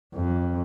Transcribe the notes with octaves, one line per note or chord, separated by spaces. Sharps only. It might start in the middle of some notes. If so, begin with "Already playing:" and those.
F2